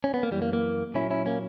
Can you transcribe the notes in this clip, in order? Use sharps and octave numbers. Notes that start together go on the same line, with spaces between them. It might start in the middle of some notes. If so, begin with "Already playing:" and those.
C#4
B3
A#3
F#2 E3 G3
A#3
A#3
A#2 F#3 C#4 E4
C#4 E4
A#3 C#4